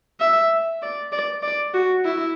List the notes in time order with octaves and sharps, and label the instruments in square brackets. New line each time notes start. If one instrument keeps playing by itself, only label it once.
[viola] E5
D5
D5
D5
F#4
E4